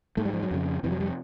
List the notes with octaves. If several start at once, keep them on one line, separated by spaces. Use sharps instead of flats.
G#2 A3
G3
F3
F#3
F2 C#3
F2 C3 E3
F#3
G3